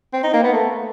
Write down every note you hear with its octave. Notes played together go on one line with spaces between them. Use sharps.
C4
D#4
A#3
B3
A3